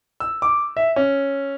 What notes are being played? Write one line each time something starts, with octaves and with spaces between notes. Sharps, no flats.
E6
D6
E5
C#4